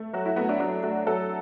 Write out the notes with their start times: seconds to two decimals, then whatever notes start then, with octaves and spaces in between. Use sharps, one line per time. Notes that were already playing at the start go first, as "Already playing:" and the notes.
Already playing: A3
0.14 F#3 F#4
0.26 E4
0.36 A3 B3
0.49 D4
0.60 F#3 D4
0.83 A3 F#4
1.07 F#3 A4